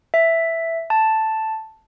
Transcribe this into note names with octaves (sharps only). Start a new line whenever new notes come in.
E5
A5